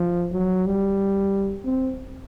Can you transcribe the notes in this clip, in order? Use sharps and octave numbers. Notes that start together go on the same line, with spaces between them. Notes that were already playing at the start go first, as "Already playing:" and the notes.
Already playing: F3
F#3
G3
C4